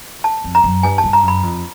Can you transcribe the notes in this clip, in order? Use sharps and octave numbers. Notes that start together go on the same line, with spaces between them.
A5
F2
A#5
F#2
G2 G#5
A5
G2
A#5
F#2
B5
F2